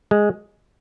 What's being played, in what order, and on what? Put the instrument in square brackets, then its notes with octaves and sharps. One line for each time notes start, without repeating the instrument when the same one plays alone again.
[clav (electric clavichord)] G#3